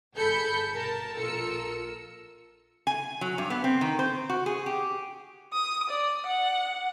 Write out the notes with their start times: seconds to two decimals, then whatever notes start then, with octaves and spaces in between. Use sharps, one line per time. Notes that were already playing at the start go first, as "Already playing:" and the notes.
0.15 G1 G#4 A4 B5 G6 C#7
0.73 B2 A#4 A5
1.17 A#1 F4 A4 A#4 E6 C#7
2.87 G#5
3.21 F#3
3.38 G2
3.50 B3
3.64 C4
3.81 D#3
3.99 C5
4.29 F#4
4.46 G#4
4.66 G4
5.53 D#6
5.90 D5
6.26 F#5